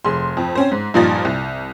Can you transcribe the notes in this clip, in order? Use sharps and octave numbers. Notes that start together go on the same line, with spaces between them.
F1 G#4 C6
F2
C4 C#4 C5
G#2
G2 A#2 F3 D#4 A6
C2